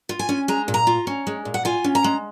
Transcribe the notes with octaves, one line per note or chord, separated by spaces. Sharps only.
F4
G#5
C#4
G#3 A#5
A#2
A#5
F4
C#4
G#3
A#2
F#5
F4 G#5
C#4
A#5
G#3